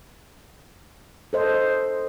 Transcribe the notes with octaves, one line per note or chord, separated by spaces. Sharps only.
A4 C5 D#5